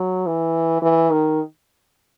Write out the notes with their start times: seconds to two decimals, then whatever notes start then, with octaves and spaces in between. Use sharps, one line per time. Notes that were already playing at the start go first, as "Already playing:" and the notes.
Already playing: F#3
0.26 E3
0.82 E3
1.11 D#3